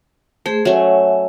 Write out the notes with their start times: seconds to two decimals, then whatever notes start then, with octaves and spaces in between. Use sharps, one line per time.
0.46 A3 G#4 C5
0.65 F#3 A3 C#4 E5 F#5 G#5